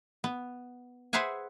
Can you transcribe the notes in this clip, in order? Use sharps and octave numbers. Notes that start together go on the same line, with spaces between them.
B3
G#4 B4 C5 E5 F#5 G#5